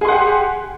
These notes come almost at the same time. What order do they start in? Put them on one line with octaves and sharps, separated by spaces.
G#4 C6 F#5 G4